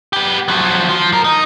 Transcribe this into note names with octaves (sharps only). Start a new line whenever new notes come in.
B3 G4
F3 F#3
F3
F#2 A#4
D#4